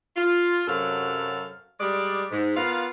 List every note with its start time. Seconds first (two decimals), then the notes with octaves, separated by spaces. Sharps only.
0.16 F4
0.68 F#2 C3 F#3 A4 F5
1.80 G3 G#3 D5
2.31 G#2
2.56 B3 F4 A#4 F5